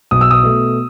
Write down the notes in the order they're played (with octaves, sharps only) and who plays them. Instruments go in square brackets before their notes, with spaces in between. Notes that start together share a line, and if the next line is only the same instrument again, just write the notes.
[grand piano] B1 D#6
E6
D#6
B2 A3